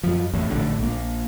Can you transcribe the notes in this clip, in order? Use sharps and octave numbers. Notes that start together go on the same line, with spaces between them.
F#2 F3
E2 A2
A#1 A2 D3
A#1 A#3